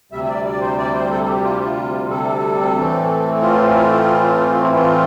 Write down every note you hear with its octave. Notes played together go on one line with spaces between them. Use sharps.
D2 C3 G3 E5
E5
D5
D5
C5
D5
C5
A4
A4
G4
F4
G4
F4
A4
A2 E3 A3 C4
F4
E4
F4